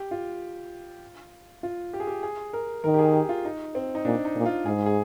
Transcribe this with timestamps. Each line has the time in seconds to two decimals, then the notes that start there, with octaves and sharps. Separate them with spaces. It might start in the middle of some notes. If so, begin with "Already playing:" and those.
Already playing: G4
0.11 F4
1.63 F4
1.93 G4
2.00 G#4
2.07 G4
2.23 G#4
2.53 A#4
2.84 D#3 A#4
2.94 G4
2.99 G#4
3.13 G4
3.29 F4
3.45 D#4
3.75 C4
3.95 D#4
4.05 A#2 D4
4.25 D#4
4.35 A#2
4.46 F4
4.65 G#2 G#4
4.86 G#4